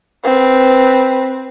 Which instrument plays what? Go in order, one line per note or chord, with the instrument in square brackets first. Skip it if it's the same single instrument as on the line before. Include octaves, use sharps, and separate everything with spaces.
[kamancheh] C4 B4